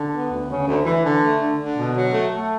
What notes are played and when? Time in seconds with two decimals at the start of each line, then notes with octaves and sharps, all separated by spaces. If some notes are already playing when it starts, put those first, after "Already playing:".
Already playing: D3
0.13 B3
0.30 D2
0.49 C#3
0.68 D2
0.85 E3
1.03 D3
1.22 A3
1.39 D3
1.59 D3
1.76 B2
1.95 F#3
2.13 A3
2.31 A3